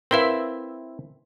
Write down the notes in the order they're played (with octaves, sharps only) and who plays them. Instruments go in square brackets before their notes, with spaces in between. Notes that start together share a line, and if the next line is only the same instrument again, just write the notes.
[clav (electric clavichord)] C4 E4 E5 [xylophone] A#4 B4 F5